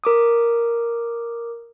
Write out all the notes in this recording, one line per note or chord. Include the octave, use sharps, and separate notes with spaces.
A#4 D6 D#6